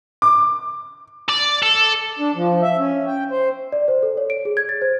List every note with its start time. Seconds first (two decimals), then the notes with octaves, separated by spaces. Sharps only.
0.22 D6
1.29 D5
1.63 A4
2.19 D4
2.35 F3
2.62 E5
2.78 C#4
3.07 G5
3.31 C5
3.72 D5
3.88 C5
4.03 A4
4.17 C#5
4.30 D7
4.45 G#4
4.57 G#6
4.69 A6
4.82 C5